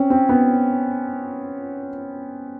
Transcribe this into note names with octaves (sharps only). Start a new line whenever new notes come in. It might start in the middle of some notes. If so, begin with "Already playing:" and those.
Already playing: C4 C#4
C4
B3